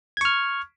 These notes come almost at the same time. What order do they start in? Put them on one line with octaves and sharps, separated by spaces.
G#6 C#6 F6